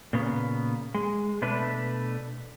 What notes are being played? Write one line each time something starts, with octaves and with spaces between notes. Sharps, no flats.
A#2 C#3 B3
G#3
B2 A3 D4 B4